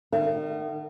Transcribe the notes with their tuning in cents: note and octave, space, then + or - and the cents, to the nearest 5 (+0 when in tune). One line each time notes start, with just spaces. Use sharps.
D#3 -30 E5 +35